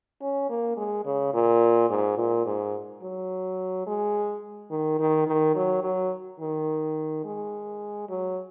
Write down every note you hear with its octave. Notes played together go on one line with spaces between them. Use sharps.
C#4
A#3
G#3
C#3
A#2
G#2
A#2
G#2
F#3
G#3
D#3
D#3
D#3
F#3
F#3
D#3
G#3
F#3